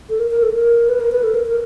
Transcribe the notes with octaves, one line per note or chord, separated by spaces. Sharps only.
A4
A#4
A#4
A4
A#4
B4
A#4
B4
A4
A#4
A#4